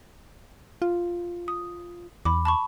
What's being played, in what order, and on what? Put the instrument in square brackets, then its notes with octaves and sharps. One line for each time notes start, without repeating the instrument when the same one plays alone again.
[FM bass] F4
[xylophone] D#6
[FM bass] E2 [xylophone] B5 D6
[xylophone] A5 B5 C#6